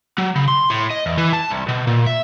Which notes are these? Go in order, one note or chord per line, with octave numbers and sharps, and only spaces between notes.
F#3
C#3
C6
A2
D#5
E2
E3
A5
C2
B2
A#2
E5